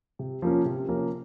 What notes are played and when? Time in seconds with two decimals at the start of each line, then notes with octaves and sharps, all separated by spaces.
0.19 C3
0.42 F3 A#3 C#4
0.65 C3
0.88 F3 A#3 C#4